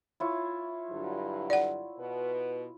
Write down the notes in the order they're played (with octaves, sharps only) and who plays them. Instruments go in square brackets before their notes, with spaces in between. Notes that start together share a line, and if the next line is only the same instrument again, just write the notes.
[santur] E4 F4 C#5
[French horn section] G2 D3 F#3
[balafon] D5 F#5
[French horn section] B2 B4